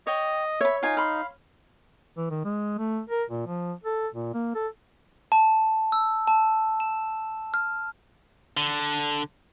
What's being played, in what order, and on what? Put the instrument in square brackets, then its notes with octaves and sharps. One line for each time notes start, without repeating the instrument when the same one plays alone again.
[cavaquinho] C#5 G5 [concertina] D#5
[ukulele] C#5 [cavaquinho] E5 B5
[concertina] D#4 [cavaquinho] F4 G#5
[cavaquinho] F5 B5 C6
[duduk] E3
D#3
G#3
A3
A#4
A#2
F3
A4
A#2
A#3
A4
[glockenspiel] A5
E6
A5
E7
F6
[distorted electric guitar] D3